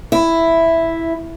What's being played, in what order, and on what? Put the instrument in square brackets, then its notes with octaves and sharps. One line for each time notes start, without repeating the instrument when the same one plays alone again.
[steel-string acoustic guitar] E4